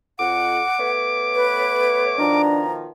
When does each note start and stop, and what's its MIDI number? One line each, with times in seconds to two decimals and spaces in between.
0.19 0.59 41
0.19 0.91 78
0.19 2.42 86
0.78 2.18 57
0.78 2.18 59
0.78 2.18 73
1.35 2.04 71
2.19 2.89 47
2.19 2.89 51
2.19 2.89 53
2.19 2.64 62
2.19 2.73 82